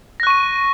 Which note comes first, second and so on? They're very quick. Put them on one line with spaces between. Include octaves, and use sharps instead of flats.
A#6 F#6 C#6 D#7